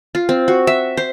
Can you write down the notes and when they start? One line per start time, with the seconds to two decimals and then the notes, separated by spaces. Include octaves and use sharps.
0.15 F4
0.29 C4
0.48 F#4
0.67 E5
0.97 C5